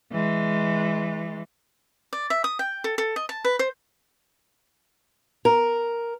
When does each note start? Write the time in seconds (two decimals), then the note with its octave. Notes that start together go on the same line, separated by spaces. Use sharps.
0.11 E3 G#3
2.13 D5
2.30 E5
2.44 D#6
2.59 G5
2.84 A4
2.98 A4
3.16 D#5
3.29 A5
3.45 B4
3.59 C5
5.45 A#4